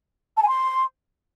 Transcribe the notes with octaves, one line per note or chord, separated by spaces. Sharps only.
A5
G#5
C6